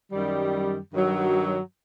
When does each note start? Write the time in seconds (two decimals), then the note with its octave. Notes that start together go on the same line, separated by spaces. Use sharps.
0.12 F#2 D#3 G3
0.93 G2 D#3 F#3